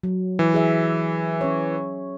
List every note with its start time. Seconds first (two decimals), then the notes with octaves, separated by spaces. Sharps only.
0.03 F#3
0.39 E3
0.54 G#4 E5
1.41 C#4 C#5